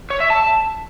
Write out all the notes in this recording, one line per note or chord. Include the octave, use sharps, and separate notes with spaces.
C#5
E5
A5